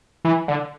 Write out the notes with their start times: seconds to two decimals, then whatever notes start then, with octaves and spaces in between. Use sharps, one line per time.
0.25 E3
0.48 D3